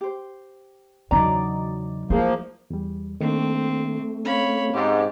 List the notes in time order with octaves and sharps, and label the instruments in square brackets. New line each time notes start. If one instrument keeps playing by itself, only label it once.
[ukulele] G4 C5
[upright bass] E2 C#3 [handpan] F#3 D#4 D5 [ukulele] A#5
[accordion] F3 A#3 [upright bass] A3 [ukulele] E4 G#4 C5
[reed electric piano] E2 G3
[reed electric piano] D#3 A#3 D4 [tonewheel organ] A3 [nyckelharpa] C4
[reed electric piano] C4 C#4 F5 [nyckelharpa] C#5 B5
[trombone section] G#2 [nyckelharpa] G4